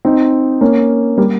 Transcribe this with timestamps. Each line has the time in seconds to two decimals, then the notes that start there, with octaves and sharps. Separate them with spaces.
0.05 C4 D#4
0.61 A#3 C#4
1.18 G3 A#3